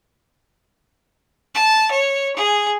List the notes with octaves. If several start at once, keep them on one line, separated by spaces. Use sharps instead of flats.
A5
C#5
G#4